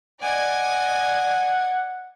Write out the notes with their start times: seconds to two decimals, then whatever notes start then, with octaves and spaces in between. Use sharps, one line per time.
0.23 D5 D#5 F#5 G#5 G#6